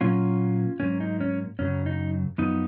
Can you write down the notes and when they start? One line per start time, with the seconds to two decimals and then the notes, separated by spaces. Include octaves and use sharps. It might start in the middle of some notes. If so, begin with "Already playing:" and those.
0.01 A#2 F#3 A#3 C#4 F4
0.80 G#2 F#3 A#3 C#4
1.00 D#4
1.21 C#4
1.59 F#2 C#3 F#3 C#4
1.86 D#4
2.38 F#2 F3 B3 D#4